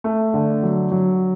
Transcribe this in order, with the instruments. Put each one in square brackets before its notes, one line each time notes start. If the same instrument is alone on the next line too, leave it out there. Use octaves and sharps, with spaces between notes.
[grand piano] A3
D3
F#3
F#3